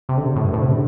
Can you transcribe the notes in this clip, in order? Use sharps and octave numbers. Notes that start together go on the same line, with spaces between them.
C3
D3
C3
A2
G2
A2
C3
D3